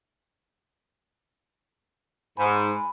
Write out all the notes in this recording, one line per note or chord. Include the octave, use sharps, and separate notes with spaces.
G#2 G#5 B5